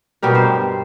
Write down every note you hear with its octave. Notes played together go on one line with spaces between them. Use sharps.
B2 G3 G4 A#4
G2 C5